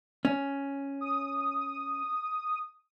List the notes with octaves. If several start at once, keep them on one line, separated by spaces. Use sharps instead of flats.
C#4
D#6